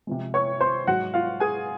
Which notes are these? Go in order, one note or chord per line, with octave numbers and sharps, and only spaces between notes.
C3 F3 G#3
C#5 C#6
C5 C6
G#2 F#3 F#4 F#5
F4 F5
G#4 G#5